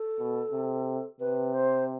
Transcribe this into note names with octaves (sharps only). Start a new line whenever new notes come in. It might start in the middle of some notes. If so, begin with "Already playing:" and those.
Already playing: A4
B2
C3
C3 B4
C5